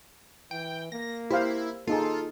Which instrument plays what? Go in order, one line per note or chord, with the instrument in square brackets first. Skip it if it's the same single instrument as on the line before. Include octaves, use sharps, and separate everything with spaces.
[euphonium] E3 [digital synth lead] G5
[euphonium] A#3 [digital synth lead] A#6
[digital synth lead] E4 [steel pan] G4 C5 F5
[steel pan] A#3 D#4 G#4 [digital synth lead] F4 [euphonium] A4